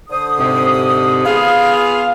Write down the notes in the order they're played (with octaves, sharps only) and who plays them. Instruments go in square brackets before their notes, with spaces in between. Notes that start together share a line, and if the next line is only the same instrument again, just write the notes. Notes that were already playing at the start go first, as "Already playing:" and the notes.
[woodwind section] D3 C5 D#6
[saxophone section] G#2 C3
[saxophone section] B3 F4 G#4 [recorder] F5